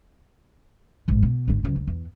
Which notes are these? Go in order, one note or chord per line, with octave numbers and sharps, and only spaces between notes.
A1 G#2
B2
G#1 D3
C#2 F#3
D2
E2